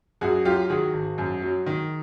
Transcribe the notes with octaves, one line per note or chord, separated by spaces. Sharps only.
F#2 F#4 G#4
F#3 F4 G4
D#3 F#4 G#4
G#1
F#2
F#3
D#3